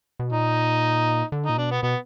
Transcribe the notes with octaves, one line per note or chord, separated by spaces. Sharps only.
B2
A#2 D#4
D3
A#2 D#4
B2 D4
B3
B2 B3